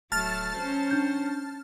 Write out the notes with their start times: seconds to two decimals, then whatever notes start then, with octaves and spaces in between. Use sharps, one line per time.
0.12 D1 F#3 A3 A5 F6 A6
0.57 F#3 C#4 C5
0.91 D4 G6